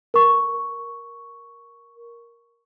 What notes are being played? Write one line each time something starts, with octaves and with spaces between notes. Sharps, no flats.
A#4 C#6